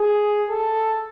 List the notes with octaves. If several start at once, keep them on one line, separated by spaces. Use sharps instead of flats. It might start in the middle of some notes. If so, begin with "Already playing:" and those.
Already playing: G#4
A4